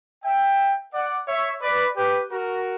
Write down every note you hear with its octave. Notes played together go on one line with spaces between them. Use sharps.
E5 G5
D5 F#5
C#5 E5
B4 D5
G4 B4
F#4 A#4